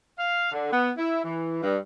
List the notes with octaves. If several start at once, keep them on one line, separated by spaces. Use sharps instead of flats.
F5
D3
B3
E4
E3
G2